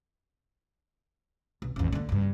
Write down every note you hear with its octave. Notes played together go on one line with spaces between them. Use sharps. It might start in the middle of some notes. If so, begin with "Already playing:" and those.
B1
A1 E2
D3 A#3
G2 C#3